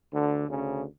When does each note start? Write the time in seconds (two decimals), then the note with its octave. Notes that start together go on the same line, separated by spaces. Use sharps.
0.13 D2 D3
0.49 D2 C#3 C#4